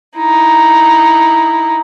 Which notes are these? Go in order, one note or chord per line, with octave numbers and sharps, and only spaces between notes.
D#4 E4